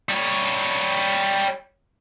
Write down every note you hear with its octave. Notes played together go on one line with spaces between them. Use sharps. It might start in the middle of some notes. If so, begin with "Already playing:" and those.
G3 C#5